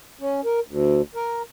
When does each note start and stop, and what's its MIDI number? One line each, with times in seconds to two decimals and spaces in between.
0.20 0.41 61
0.45 0.60 70
0.67 1.02 38
1.15 1.42 70